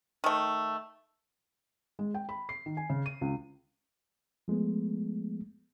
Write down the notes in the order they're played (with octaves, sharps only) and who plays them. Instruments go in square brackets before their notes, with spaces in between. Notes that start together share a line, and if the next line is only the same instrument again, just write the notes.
[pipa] D#3 A3
[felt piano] G#3
G5
B5
C7
D#3
G#5
C#3
D#7
C#2
[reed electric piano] F3 G#3 A3 B3